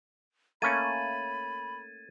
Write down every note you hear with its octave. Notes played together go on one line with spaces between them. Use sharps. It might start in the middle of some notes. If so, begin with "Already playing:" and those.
A3 A#3 C#4 B5 G#6 A6 D#7